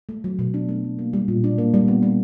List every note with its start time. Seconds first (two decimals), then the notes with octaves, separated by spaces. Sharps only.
0.09 A3
0.24 F#3
0.39 B2
0.54 D4
0.69 A3
0.84 F#3
0.99 A#3
1.13 G3
1.28 A#2
1.44 D4
1.58 A#3
1.74 G3
1.88 B3
2.03 G3